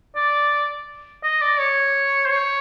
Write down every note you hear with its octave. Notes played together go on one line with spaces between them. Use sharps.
D5
D#5
D5
C#5
C5
C#5